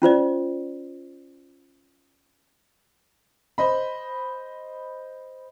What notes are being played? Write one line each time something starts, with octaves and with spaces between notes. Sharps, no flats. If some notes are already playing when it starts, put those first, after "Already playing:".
C#4 F4 C5 D5
C5 D#5 B5